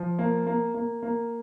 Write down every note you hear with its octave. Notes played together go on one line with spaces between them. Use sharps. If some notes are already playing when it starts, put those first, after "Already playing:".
Already playing: F3
A#3
A#3
A#3
A#3